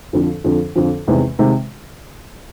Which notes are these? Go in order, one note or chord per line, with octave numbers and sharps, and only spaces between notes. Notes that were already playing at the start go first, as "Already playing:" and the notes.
F2 D3 F3
F2 D3 F3
F2 D3 F3
E2 C3 D#3 G#3
C3 D#3 G#3